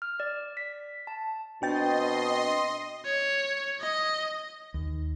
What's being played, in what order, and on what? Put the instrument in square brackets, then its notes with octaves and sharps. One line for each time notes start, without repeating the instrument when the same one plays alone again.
[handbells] F6
D5
B6
A5
[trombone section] B2 C4 [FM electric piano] D4 G5 A6 [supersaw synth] D#5 C6
[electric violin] C#5
D#5
[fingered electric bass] D#2